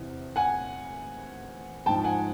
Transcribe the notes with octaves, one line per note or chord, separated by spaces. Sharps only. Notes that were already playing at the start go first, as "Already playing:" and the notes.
Already playing: E2 C3 E3
F#5 G#5
G#2 F3 G5 A5
F#5 G#5